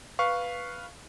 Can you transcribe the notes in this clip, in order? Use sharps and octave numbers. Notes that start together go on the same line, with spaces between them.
B4 F5 C#6